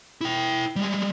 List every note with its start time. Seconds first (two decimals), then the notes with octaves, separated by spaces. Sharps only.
0.21 E4 G5
0.76 G3 G#3